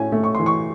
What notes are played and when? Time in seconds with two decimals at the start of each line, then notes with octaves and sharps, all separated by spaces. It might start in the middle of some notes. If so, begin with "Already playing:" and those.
Already playing: A2 C#4 G#5
0.12 A3
0.24 C#6
0.35 E3 C6
0.46 C#6